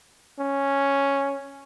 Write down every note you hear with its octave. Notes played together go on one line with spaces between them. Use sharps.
C#4